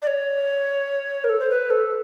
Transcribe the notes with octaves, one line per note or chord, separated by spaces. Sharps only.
D5
C#5
A#4
A4
C5
B4
A4